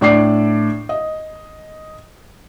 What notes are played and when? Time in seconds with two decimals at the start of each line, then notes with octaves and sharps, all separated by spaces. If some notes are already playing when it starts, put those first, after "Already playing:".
0.01 A2 D4 D5 D6 C7
0.89 D#5